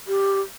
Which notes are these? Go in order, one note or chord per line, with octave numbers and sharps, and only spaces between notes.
G4